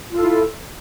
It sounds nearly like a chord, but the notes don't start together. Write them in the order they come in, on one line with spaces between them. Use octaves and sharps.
F4 A4 E4